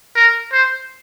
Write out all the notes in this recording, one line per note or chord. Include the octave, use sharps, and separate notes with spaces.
A#4
C5